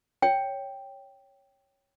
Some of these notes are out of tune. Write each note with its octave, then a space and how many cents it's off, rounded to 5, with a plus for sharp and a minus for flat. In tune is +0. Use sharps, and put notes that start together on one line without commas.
C#5 +0 G5 +0